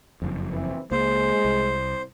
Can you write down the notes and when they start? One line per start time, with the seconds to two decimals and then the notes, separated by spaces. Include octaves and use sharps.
0.22 F#1 F2
0.53 E3 C4
0.91 C#2 G#3 A#3 C5
1.45 C2